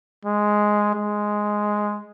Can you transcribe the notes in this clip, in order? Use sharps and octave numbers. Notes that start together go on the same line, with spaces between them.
G#3
G#3